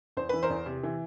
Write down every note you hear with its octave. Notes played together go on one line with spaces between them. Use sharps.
E2 C5
E3 B4
A#4 C5
E2
C3
E3